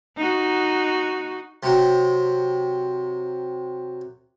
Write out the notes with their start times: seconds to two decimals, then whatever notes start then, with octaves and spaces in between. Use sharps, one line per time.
0.17 D#4 F#4
1.63 C3 F#3